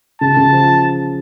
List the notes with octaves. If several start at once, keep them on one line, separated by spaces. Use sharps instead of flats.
C#3 A5
C#3
F3